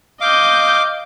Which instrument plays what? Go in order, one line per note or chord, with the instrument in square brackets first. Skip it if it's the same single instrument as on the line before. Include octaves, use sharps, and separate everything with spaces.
[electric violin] D#5 G6 [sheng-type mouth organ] F5 D6